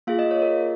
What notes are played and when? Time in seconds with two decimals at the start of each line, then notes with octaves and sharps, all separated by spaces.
0.07 A#3 F4 G#4 F5
0.19 D#5
0.31 C#5
0.42 A#4